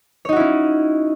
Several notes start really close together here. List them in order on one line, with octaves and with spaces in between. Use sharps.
C#5 D#4 F#4 E4 C#4